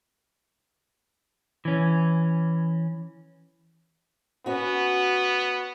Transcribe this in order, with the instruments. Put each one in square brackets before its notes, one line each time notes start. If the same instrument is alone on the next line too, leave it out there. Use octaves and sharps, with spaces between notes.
[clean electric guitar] E3 C#4
[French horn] B3 [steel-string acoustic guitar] C#4 F#4